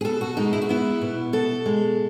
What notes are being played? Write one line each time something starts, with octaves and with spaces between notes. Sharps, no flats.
G#4
B2 A4
F#4
G#3 D#4
E4
F#4
B3 E4
B2
B2 A4
G#3